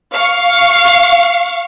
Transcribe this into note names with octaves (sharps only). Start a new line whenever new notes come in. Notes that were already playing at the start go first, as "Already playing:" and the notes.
F5 C#6